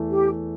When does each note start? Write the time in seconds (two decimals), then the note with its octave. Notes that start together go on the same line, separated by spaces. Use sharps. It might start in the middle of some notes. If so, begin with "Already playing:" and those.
Already playing: E2 E3 A3
0.11 G4